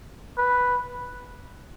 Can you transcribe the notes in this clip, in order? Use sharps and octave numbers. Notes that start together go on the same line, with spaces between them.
B4